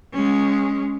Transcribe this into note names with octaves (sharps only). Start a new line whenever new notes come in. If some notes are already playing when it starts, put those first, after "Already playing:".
G#3 C#4